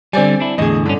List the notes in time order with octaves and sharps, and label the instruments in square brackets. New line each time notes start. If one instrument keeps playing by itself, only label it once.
[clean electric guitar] D3 G3 [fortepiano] C4 D5 G#5
[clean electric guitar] D4 E4
[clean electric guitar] E2 A2 D3 [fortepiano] G#4 D#5
[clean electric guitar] G2 C#4 [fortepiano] D3